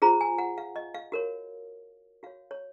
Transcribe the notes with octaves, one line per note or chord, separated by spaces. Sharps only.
F4 G#4 C5 A#5
G#5
F#5
F5
D#5
F5
F#4 A#4 C#5
F#4 C#5 F5
C#5